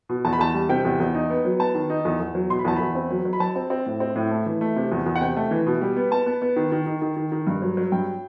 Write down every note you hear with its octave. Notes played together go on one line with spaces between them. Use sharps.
B2
E2 A5
B5
E2 A5
G3
C3 G5
E2
E2
D#4
B3
F#3
B3 A5
D#3
D#4
E2
E2
F#3
B2 C6
B5
E2 A5
E2 B5
C4
F#3
F#3
B5
F#3 A5
C4
C4
A2
C4
A2
A3
E3
A3
C3
E2
E2
F#5
C3 G5
A3
E3
B2
G3
B3
B3 A5
B3
B3
D#3
D#3
D#3
D#3
D#3
D#3
G2
F#3
F#3
G2 G5